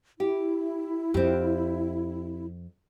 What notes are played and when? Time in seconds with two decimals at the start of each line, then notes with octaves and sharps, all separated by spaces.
0.20 E4 G4
1.14 F2 C4 G4